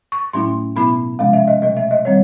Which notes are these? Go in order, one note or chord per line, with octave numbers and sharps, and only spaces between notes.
C#6
A2 F#3 A3 C#4 E4 C6
B2 F#3 B3 E4 B5
C3 F3 G#3 C#4 F5
E5
D#5
B2 F#3 A3 D#5
E5
D#5
D#3 G3 C4 C#5